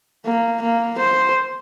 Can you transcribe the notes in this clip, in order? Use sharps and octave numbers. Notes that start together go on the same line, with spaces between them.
A#3
A#3
C5